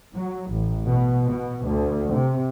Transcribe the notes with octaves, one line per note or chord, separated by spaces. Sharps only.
F#3
A1
B2
B2
D2
C3